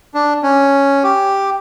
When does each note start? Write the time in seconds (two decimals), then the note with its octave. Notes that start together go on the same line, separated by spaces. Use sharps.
0.14 D4
0.43 C#4
1.04 G4